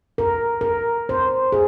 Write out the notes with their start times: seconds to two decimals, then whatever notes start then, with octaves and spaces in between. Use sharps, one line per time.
0.18 A#4
0.61 A#4
1.09 C5
1.52 G#4